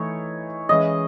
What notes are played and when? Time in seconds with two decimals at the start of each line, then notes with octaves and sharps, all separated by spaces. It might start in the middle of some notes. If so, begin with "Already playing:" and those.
Already playing: E3 A3 D#4 C#5
0.69 E3 G#3 C#4 G#4 D#5